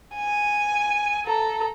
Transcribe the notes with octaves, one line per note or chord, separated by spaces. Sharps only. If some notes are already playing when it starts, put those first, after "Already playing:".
G#5
A4 A#5